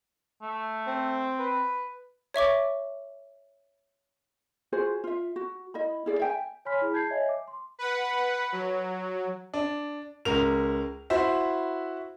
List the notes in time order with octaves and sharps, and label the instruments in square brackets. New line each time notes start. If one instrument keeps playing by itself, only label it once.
[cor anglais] A3
[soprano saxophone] C4
[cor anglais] B4
[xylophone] C#5 E5 C#6 D6
[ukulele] F4 F#4 G#4 C5
F4 E5
F#4
E4 D#5 B5
E4 G#4 D5
E5 G5 G#5
[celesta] C#5 G#5 B5 C6 F6 B6
E4 G#4 B5
A5 G6 G#6 C7
C#5 D#5 E5 G#5
D6
C6
[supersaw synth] B4 F#5
F#3
[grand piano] D4
C#2 A#4 F7
E4 F#4 C5 E5